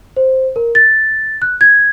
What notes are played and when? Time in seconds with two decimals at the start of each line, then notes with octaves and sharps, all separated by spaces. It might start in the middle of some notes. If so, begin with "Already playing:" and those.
0.17 C5
0.56 A#4
0.75 A6
1.42 F#6
1.61 G#6